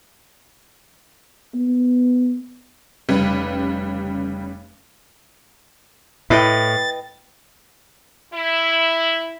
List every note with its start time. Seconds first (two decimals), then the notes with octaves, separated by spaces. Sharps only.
1.54 B3
3.09 F1 C#3 G3 B4
6.30 A2 E4 B4 D#5 G5 A6
8.34 E4